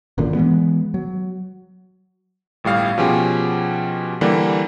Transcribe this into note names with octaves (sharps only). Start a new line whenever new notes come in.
G#1 F#2 A#2 D3
E3 G#3 B3
F#3
G1 A2 G3 F5
B2 F3 C#4 G4 G#4
D3 E3 G3 A#3